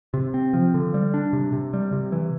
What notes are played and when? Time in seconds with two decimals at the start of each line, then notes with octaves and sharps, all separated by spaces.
0.14 C3
0.34 C4
0.53 F3
0.74 D3
0.94 G3
1.14 D4
1.33 C3
1.53 C3
1.73 G3
1.93 C3
2.12 E3